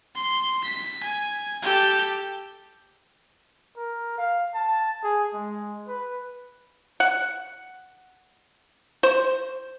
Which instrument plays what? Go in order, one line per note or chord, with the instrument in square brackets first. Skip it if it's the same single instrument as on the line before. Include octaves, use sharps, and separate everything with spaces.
[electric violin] C6
B6
G#5
G4 A4
[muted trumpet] A#4
F5
A5
G#4
G#3
B4
[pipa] F#5
C5